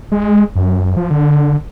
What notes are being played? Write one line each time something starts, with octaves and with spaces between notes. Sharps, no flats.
G#3
F#2
F3
D3